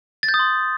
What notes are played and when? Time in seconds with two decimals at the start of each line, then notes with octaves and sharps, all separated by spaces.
0.23 A6
0.29 G6
0.34 D#6
0.39 C6